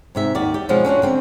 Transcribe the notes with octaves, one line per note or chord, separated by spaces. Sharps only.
G#2 C3 E5
D#2 F#4 D5
G4
B2 F3 G#3 B3 C#4
C#4 D4 F4 F#4
C#3 C4 D4